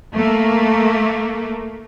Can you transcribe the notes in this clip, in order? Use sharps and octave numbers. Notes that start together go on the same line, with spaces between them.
A3 A#3